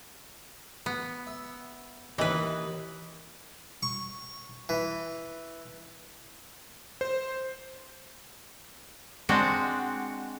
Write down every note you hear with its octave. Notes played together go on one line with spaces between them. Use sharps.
B3
E5
D#2 D#3 E3 B4 D#5
C#6
E3
C5
G#3 C4 D4 F#4